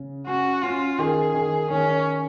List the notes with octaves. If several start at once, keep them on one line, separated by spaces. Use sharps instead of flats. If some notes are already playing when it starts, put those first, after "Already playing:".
Already playing: C#3
C#4 F#4
C#4 F4
D#3 G#4
D#3
D#3 C#4